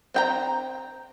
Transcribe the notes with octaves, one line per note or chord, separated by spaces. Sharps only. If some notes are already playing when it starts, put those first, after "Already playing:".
C4 G5 A#5